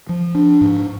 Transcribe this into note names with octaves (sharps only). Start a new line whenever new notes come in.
F3
D4
G#2